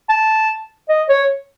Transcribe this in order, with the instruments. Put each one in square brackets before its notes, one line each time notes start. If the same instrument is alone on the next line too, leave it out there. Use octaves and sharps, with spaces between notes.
[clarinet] A5
D#5
C#5